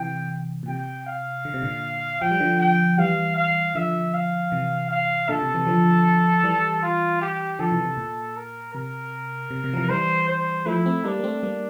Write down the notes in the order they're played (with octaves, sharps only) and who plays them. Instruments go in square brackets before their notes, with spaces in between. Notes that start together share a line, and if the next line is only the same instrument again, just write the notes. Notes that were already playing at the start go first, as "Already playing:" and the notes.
Already playing: [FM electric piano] C3 E3 [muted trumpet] G5
[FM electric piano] A#2
[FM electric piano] C3 [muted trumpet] G5
[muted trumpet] F5
[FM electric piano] D3
C3
A#2 D3
[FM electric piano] F3 [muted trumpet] G5
[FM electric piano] G3
D3 F3
[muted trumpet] G5
[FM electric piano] E3 G3 [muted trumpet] F5
[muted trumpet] F5
[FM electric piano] D3 F3 [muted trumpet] E5
[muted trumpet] F5
[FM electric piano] C3 E3
[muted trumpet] F5
[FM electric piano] A#2 D3 [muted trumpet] A4
[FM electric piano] C3
C3 E3
D3 F3
E3 G3
[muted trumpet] F4
G4
[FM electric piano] D3 F3 [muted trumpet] A4
[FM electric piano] C3 E3
C3
A#2
[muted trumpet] A#4
[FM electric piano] C3 [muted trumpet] A#4
[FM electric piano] C3
C3
F3
C3 E3
[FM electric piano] E3 G3 [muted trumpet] C5
[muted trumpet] C5
[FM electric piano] F3 A3 [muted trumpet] E4
[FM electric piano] A3 C4
[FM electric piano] G3 A#3 [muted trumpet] D4
[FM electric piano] A#3
A3 C4
G3 A#3